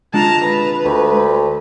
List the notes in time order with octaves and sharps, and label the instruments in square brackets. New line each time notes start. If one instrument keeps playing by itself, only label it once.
[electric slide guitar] G#3 D4 F4 [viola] A5 A#5
[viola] B4
[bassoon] D2